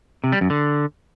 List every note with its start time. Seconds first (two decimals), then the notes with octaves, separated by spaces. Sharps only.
0.24 C3
0.32 G3
0.41 F#2
0.50 D3